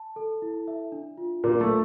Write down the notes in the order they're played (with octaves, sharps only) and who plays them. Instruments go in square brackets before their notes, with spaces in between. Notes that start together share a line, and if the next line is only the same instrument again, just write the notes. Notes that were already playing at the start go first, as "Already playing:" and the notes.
Already playing: [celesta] A5
A4
E4
E5
D4
F4
[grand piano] A#2 A#3 [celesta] D4
[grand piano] A3
[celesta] C5